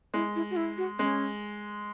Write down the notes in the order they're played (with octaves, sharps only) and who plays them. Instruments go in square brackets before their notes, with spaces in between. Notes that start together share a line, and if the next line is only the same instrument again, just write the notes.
[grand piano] G#3 [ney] E4
[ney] E4
F#4
E4
F#4
[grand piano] G#3 [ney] C#4